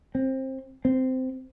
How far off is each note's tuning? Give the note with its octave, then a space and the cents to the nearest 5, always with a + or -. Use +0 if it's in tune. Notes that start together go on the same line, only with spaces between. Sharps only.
C4 +20
C4 -15